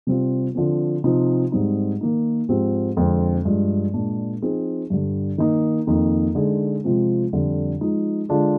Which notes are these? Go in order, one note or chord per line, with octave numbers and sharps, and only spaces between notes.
C3 G3 C4 F4
D3 F3 C4
C3 F3 C4 D#4
G#2 G3 C4 D#4
D#3 A#3 D#4
G#2 F3 C4 G4
F2 D3 G#3 C4
G2 F3 G#3
A#2 G#3 D4
F3 C4 D#4 G#4
G2 D3 G3
D#3 A#3 D#4
F2 D#3 A#3 D#4
D3 G#3 D#4 G#4
C3 F3 G#3 C4 F4
F2 D3 G3
F3 G#3 D#4
D3 G#3 D4 F4 G#4